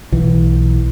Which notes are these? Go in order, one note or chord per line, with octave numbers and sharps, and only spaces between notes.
B1 E3